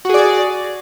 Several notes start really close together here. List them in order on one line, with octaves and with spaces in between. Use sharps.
F#4 G#4 D5